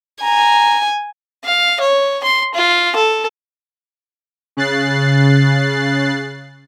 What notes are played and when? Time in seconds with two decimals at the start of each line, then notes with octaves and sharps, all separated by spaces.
0.22 G#5 A#5
1.44 F5
1.80 C#5
2.23 C6
2.54 F4
2.95 A4
4.57 C#3 F#6 A6 C7